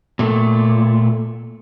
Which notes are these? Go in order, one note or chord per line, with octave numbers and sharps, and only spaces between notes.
A#2 A3